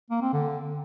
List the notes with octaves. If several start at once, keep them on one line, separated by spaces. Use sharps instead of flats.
A#3
C4
D3